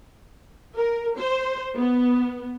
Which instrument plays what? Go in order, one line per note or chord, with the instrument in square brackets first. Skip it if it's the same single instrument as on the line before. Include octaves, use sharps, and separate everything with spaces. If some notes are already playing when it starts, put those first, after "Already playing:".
[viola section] A#4
C5
B3